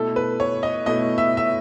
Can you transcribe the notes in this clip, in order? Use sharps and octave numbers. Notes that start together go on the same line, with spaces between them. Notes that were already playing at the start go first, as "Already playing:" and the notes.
Already playing: B2 A3 E4 A4
B4
C#5
D#5
B2 A3 E4 D#5
E5
E5